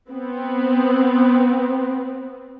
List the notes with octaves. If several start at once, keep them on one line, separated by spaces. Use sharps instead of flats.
B3 C4